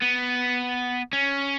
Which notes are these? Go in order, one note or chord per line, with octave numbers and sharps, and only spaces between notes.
B3
C#4